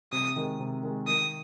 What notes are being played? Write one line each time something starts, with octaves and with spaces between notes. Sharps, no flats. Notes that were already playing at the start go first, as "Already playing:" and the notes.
C3 D#6
D#3 G#3
C3
D#3 G#3
D#3 D#6